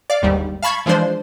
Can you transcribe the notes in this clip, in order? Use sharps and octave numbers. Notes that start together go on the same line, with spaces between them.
D5 F5
G1 D#2 G#2 G3
F5 A5 B5 C#6 G#6
E3 F3 G#3 D4 C5